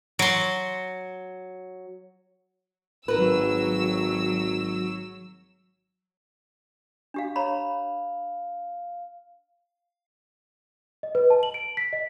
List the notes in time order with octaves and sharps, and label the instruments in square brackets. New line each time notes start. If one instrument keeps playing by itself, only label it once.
[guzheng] F#3 C6
[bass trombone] G#1 [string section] F#3 E6 [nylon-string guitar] A#4 B4
[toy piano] D4 G4 F5
[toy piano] C#5 A#5 B5 [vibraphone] F5
[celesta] D#5
B4
A5
F#7
D7
B6
D#5